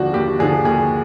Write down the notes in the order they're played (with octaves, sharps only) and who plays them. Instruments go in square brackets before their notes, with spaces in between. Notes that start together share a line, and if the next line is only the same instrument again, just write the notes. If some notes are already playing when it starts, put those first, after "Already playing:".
Already playing: [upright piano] D#2 D3 F3 D4 F#4
D#2 G4
D3 F3 G#4
D#2 G#4